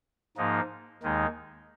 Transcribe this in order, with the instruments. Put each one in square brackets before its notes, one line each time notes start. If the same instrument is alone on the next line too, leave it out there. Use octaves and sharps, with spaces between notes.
[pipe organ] G#2 F3 A#3 D#4
D#2 D#3 G#3 D#4